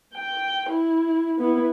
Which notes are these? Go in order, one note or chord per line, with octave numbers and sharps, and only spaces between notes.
G5
E4
B3 E4